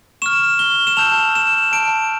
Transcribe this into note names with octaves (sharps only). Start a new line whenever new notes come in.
C#6 F6 E7
G7
E7
A5 E6 G6 F7
E7
A5 E6 G6 D7